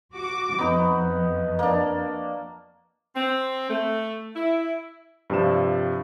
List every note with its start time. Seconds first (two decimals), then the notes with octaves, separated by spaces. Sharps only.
0.13 F#4 D6
0.58 F2 B3 D#4 F#4
1.59 A#3 D4
3.16 C4
3.70 A3
4.36 E4
5.30 G2 C3 F3 E7